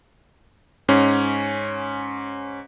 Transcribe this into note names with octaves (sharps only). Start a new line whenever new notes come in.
G#2 C#4